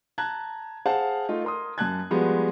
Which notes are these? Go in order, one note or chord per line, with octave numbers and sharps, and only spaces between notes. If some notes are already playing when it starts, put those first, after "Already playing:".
A5 A#5 F#6 G#6
G#4 C5 F5 F#5 A5
A3 D#4 F4
A#4 C6 D#6
F#2 A5 F#6 G#6
F3 G3 G#3 B3 F#4